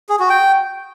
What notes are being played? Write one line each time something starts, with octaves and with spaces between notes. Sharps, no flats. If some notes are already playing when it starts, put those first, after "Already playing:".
G#4
F#4
G5